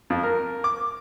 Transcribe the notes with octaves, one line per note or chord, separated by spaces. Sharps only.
F2
A#4
D6